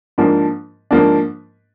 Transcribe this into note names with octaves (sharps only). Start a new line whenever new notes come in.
G#2 F3 A#3 D4
G#2 F3 A#3 D4